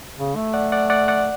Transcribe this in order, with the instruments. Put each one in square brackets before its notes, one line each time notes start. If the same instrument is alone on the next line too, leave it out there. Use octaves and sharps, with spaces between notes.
[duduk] C#3
A3
[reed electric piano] D5 F#5
D5 F#5
D5 F#5
D5 F#5